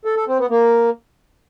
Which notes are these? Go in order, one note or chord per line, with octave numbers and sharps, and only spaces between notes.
A4
A4
C4
B3
A#3